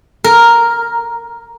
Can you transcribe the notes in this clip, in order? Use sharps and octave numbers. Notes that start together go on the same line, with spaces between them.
A#4